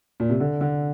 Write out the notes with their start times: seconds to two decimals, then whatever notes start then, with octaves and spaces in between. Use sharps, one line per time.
0.20 A#2
0.30 C3
0.40 D3
0.61 D3